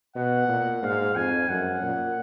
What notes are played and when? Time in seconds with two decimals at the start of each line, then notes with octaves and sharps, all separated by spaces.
0.16 B2 F#5
0.49 A#2
0.82 G#2 F5
1.15 F2 G#5
1.49 F#2 F#5
1.82 A#2